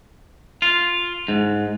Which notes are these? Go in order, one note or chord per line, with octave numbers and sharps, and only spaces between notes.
F4
G#2